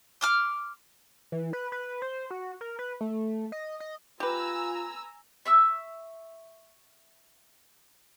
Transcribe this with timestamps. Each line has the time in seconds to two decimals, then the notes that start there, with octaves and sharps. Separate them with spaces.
0.21 C6 D6 F6
1.32 E3
1.53 B4
1.72 B4
2.02 C5
2.31 F#4
2.61 A#4
2.79 B4
3.01 A3
3.52 D#5
3.80 D#5
4.20 F4 G4 B4 G#5 A#5 E6
5.45 E5 C#6 E6